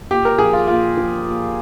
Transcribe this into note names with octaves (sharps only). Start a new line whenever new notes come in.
A#2 G4
A#4
F3 G#4
F4
A#2 F4
F3
A#2